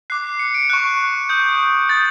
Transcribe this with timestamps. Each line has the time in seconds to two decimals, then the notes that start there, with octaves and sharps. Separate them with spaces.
0.10 D6 F#6 C7
0.24 C7
0.39 C#7
0.54 D7
0.70 C#6 F#6
1.29 D#6 G6
1.89 D#6 G6 A6